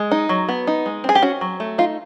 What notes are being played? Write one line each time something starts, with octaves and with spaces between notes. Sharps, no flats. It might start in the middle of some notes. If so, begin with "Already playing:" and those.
Already playing: G#3
D#4
F#3
B3
D#4
G#3
C4 G#4
G4
C#4 F#4
F#3
A3
D#4 F4